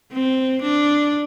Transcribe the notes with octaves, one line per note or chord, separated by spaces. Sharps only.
C4
D4